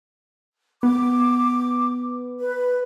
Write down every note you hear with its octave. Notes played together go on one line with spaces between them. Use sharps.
B3 D6
B4